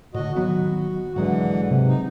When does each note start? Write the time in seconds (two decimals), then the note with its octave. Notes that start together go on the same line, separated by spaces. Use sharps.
0.14 A2 D3 F#4 D#5
0.36 D#3 F#3 B3 F#4
1.16 G#2 D3 E3 F#3 G#3 F#5
1.71 C3
1.88 D#4